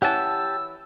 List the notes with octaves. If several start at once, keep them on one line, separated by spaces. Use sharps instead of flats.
E3 C#4 G4 F#5 A5 E6